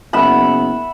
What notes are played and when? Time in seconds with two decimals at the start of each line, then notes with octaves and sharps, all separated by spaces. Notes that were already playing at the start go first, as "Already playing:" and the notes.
0.13 F#1 B3 E5 F#5 B5